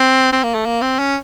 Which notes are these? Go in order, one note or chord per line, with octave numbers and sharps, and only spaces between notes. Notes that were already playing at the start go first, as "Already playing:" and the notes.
Already playing: C4
C4
A#3
A3
A#3
C4
C#4